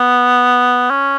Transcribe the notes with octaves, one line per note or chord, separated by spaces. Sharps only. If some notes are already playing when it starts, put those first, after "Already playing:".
Already playing: B3
C#4